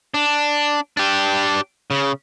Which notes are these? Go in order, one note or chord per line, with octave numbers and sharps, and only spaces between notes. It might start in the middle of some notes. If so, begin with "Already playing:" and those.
D4
D4 G4
C#3